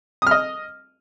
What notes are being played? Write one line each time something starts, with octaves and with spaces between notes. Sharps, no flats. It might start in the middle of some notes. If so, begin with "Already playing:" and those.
D#5 D#6 F6